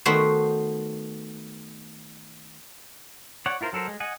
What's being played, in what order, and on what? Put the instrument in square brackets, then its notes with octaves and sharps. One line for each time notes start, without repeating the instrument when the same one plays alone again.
[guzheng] D#3 A3 B3 F#4 C5
[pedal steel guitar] C#5 D5 F#5
E4 F4 A#4 C5
F#3 A4 A#4 C5
G#3
D#5 F#5 G#5